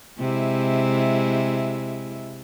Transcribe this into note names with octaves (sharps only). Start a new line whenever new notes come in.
C3 G#3 E4